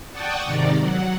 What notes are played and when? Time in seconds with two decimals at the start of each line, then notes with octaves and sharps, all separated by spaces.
0.11 D5 F#5 G5 A5 C#6 D#6
0.45 G#2 C3 D#3 D#4 D5
0.79 F#3 F#5